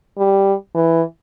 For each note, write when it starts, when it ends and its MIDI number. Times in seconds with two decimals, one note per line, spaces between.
0.18 0.53 55
0.75 1.02 52